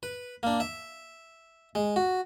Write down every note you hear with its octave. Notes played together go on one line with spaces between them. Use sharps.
B4
A#3 D4
E5
G#3
F#4